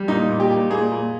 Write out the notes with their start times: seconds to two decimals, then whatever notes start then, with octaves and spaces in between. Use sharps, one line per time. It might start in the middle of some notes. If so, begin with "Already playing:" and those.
Already playing: G3
0.08 A#2 D#4
0.29 A#2
0.40 G4
0.50 A#2
0.70 A#2 G#4
0.92 A#2